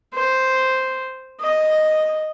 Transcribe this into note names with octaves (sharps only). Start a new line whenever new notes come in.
C5
D#5